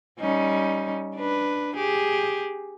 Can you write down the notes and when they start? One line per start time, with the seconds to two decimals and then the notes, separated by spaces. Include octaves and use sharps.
0.20 G3 C#4 D#4
1.15 D4 B4
1.76 G4 G#4